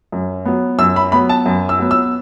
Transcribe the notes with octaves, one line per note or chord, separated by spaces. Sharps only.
F#2
F#3 B3
F#2 E6
B5
F#3 B3 B5
A5
F#2
E6
F#3 B3
E6